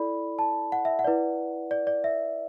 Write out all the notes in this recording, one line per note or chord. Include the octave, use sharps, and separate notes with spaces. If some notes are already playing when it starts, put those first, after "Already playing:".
Already playing: E4 A4 D5 B5
A5
F#5
E5
F#5
E4 B4 D5
D5
D5
E5